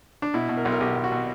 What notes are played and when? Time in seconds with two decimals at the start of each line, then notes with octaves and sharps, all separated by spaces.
0.22 D4
0.34 B2 E4
0.49 B2
0.57 A#4
0.65 B1
0.72 A#4
0.80 B1 G4
0.97 B1
1.04 F#4
1.12 B2